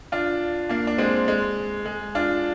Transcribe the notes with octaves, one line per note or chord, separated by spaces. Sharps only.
D4 F4
A#3 D4
D4
G#3 C4
G#3
G#3
D4 F4